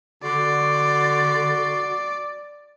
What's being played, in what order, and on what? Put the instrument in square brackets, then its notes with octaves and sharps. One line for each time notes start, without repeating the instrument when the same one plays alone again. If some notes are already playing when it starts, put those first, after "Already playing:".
[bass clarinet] D3 [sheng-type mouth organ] F#4 C6 [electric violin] D5